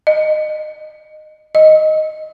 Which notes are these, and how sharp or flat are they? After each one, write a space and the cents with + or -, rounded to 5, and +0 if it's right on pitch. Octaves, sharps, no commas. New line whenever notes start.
D#5 -20
D#5 +0